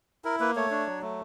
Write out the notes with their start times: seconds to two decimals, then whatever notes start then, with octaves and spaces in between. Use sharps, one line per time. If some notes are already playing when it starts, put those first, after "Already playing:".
0.25 E4 A#4
0.40 A#3 B4
0.56 A3 C#5
0.71 D4
0.87 F#3
1.02 A3